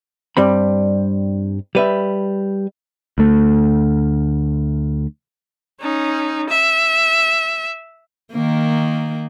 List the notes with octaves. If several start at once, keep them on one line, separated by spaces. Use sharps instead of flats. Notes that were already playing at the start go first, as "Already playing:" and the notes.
G2 G3 C4 B5
G3 B4 E5
D2 A3
C#4 D#4
E5
D#3 A#3